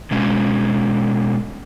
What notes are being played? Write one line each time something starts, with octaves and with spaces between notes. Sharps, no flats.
B2 G#3 C#4